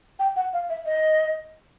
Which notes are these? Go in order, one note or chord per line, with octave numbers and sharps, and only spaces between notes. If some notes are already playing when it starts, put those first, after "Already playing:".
G5
F#5
F5
E5
D#5